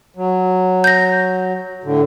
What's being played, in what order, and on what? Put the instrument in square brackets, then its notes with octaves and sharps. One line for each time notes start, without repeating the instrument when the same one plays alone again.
[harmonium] F#3
[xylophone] G6 A#6
[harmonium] A2 D3